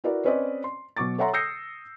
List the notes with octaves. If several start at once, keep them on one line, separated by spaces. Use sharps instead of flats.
E4 F#4 A#4 B4 D5
C4 C#4 B4 C5 D5 D#5
C6
B2 F#3 C#6 D6 A6
A4 C#5 E5 F#5 A#5 C6
D#6 E6 G6 A#6 C7 C#7